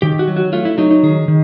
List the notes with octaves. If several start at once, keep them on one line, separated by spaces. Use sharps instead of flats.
D#3 G4
F#4
F#3
F#4
A3 F4
E4
F#3 D#4
D#4
D#3 G#4
D#3